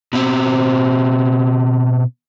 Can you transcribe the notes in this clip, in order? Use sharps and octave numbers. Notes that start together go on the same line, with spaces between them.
B2 C4